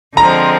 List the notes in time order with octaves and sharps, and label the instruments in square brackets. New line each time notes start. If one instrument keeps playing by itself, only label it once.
[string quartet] D3 F3 G#3 C4 [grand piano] A#5